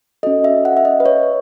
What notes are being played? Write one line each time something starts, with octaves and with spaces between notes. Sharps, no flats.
C#4 F#4 A4 D#5
E5
F#5
E5
D#5
B4
C#5